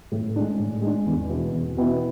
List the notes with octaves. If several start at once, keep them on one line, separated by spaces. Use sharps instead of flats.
A2
G#3 D4
A2
G#3 D4
E2
B2 B3 E4
E2
B2 B3 E4